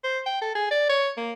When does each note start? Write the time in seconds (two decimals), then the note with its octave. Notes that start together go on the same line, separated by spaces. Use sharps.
0.04 C5
0.26 G5
0.42 A4
0.55 G#4
0.71 D5
0.89 C#5
1.17 A#3